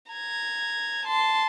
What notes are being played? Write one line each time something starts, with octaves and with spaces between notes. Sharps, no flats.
A#5 G#6
A5 C6